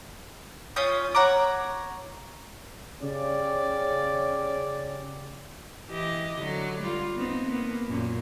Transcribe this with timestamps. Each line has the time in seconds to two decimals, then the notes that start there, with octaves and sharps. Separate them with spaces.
0.76 C#4 F4 D#6 G6
1.15 C#5 F#5 A#5 D6
3.02 C#3 C#4 G4 D5
5.88 E3 G4 D#5
6.38 D3 F#3
6.82 G3 F4
7.16 B3 C4 D#4
7.46 A#3 B3
7.87 F#2 A#2